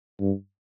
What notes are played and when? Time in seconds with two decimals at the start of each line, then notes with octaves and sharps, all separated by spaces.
0.21 G2